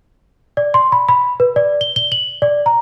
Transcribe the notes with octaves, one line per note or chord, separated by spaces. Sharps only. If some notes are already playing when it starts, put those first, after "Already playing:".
D5
C6
B5
B5
B4
D5
G7
G7
F#7
D5
A#5